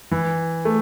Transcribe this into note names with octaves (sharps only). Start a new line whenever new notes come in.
E3
A3